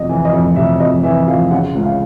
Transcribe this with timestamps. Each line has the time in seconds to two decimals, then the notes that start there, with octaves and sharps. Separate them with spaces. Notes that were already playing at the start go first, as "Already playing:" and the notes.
Already playing: F2 C3 D#5
0.09 E3
0.25 D#5
0.33 F2
0.56 C3 E5
0.80 F2 D#5
1.03 E3 E5
1.27 F2 F5
1.51 C#3 F#5
1.75 C#2
1.83 F5